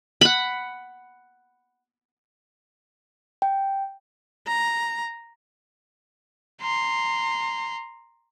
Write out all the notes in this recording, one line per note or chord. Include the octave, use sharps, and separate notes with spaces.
F#5 B5
G5
A#5
A#5 C6